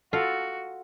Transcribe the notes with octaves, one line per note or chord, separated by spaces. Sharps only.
F4 F#4 A4